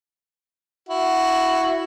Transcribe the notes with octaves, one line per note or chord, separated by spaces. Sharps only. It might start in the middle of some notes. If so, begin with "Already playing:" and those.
E4 F#4